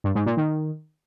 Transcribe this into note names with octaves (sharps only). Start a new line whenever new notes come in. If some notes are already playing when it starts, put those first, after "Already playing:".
G2
G#2
A#2
D#3